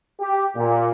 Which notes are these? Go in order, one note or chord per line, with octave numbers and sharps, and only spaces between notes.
G4
A#2